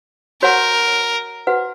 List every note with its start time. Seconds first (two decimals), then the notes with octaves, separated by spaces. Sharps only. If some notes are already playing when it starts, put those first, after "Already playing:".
0.42 F#4 A#4 C#5 F#5 A#5 C#6
1.47 F#4 B4 F#5